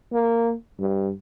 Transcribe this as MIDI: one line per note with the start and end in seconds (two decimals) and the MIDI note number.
0.12 0.53 58
0.79 1.12 43